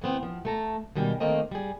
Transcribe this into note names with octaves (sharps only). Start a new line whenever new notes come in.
E3 A3 B3 C4
F3
A3 A4 A#5
B2 D#3 G3 G#3 G4
D#3 A3 A#3 C4 D#5 G5
G3 G#4